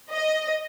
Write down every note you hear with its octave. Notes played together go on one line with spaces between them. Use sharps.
D#5